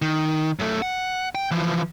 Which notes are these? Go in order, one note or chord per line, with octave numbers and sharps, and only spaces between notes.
D#3
F#2 A3
F#5
G5
E3 F3